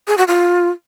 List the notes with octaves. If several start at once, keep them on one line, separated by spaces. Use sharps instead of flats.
G#4
F#4
F4